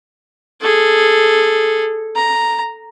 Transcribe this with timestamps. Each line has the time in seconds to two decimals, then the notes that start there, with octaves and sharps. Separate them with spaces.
0.61 G#4 A4
2.16 A#5